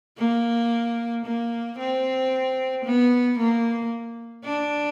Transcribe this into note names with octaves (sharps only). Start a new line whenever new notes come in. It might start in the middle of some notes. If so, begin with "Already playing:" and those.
A#3
A#3
C4
B3
A#3
D4